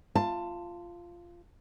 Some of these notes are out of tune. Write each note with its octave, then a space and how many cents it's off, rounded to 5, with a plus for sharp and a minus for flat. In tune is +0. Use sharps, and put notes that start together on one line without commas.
F4 -10 A5 +15